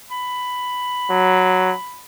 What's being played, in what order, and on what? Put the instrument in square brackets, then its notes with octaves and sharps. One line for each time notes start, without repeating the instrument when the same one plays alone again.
[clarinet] B5
[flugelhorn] F#3